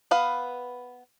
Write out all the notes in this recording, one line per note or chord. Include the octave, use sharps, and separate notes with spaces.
B3 B4 F5